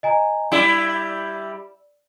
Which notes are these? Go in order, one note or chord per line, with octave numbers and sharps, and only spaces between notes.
D#5 G#5 A#5
G3 E4 D5 E6 E7